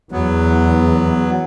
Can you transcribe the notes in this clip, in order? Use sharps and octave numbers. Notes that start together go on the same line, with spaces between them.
E2 F#3 B3